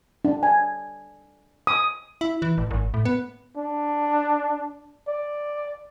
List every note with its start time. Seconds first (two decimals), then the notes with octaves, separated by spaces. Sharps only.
0.25 D4
0.43 G#5
1.67 D#6
2.21 E4
2.42 E3
2.58 A1
2.71 G#1
2.94 A2
3.05 B3
3.57 D4
5.08 D5